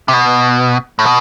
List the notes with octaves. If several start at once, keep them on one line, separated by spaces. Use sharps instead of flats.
C3
B2
A2
B2